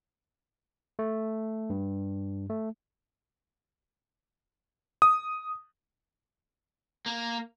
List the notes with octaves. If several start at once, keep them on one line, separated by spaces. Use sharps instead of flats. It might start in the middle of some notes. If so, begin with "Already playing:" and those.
A3
G2
A3
D#6
A#3